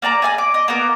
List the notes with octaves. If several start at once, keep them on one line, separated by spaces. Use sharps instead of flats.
A#3 D5 A5 A#5
G#4 D5 F5 G#5
D6
D#5
A#3 B3 A#4 D6